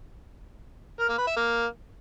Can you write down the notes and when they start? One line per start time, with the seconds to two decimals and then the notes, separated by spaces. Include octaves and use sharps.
1.00 A#4
1.09 A#3
1.18 B4
1.27 E5
1.36 A#3